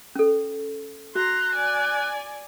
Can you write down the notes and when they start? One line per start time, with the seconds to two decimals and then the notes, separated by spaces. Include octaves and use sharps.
0.15 C#4 A4
1.15 F#4 A#5 C6 F#6
1.55 D5 G#5